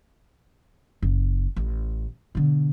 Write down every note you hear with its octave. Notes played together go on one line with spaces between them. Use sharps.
F#1
A1
B2 D3